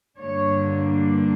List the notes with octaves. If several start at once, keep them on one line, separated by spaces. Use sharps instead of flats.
G2 D3 A#3 D4 C#5